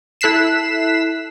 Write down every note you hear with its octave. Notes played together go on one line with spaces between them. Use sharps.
E4 A4 F#6 B6 C7 E7